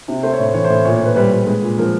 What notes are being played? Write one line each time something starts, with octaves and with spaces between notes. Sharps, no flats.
C3
A3 C5
C#5
A2 C5
E3 C#5
C5
A2
A#2 C#5
C5
A#2 B4
G3 B4
G3
G#3
A#2
F3 A#4